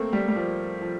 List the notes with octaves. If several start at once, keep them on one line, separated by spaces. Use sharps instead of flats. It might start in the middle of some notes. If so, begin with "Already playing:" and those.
Already playing: A3 A#3 C4
G3
G3
F3
F3